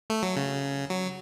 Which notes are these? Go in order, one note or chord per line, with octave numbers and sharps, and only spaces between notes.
A3
F#3
C#3
F#3